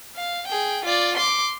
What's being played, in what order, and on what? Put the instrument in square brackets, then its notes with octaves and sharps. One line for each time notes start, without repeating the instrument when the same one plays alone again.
[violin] F5
G#4 G5
F4 D5
C6 D6